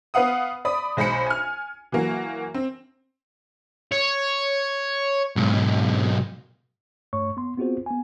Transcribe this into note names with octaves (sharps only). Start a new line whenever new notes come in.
B3 B4 F5 F#5 D#6
D5 B5 D#6
B1 G#3 C5 B5 C#7
G#5 F6
E3 F#3 A#3 F#4
C4
C#5
B1 G#2
G2 A3 C#5 C#6
B3 C6
B3 C4 F4 F#4 G#4 C5
B3 G#5